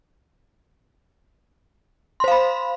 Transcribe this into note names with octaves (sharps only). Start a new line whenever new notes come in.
C5 F5 B5 C6